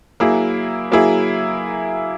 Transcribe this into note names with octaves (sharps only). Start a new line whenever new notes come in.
F#3 A#3 E4 G#4
F#3 A#3 E4 G#4